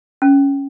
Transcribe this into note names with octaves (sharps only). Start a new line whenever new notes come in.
C#4